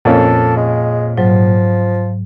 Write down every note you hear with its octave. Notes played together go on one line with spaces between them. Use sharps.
F2 A#2 A#3 C#4 A4
G#3
G#2 F3 F#3